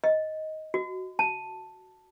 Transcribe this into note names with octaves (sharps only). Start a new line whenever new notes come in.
D#5
F#4
A5